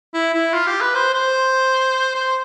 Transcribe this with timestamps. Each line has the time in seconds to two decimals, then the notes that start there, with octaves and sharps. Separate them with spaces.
0.14 E4
0.34 E4
0.53 F4
0.67 G4
0.81 B4
0.94 C5
1.14 C5
2.15 C5